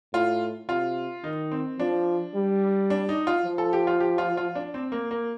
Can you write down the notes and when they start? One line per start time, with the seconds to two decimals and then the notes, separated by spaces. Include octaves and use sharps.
0.13 A2 F4
0.69 C3 F4
1.24 D#3 D#4
1.51 C4
1.79 F3 D4
2.35 G3
2.90 D4
3.09 D#4
3.27 F4
3.45 F3
3.58 A4
3.73 G4
3.87 F4
4.00 G4
4.18 F4
4.37 F4
4.55 D4
4.74 C4
4.92 A#3
5.11 A#3